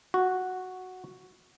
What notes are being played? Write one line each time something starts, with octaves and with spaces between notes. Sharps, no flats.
F#4